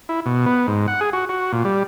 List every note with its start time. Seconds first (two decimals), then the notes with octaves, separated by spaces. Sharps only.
0.09 E4
0.26 B2
0.46 B3
0.67 G#2
0.88 F#5
1.01 G#4
1.13 F#4
1.29 F#4
1.52 A#2
1.65 G3